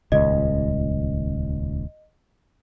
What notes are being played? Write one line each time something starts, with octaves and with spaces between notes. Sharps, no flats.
D#1 C#2 D#5